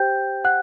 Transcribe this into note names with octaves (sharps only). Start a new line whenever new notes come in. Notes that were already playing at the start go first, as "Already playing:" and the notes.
Already playing: G4 C5 G5 G6
F#5 F#6